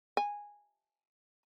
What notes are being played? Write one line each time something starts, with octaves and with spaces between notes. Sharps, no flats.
G#5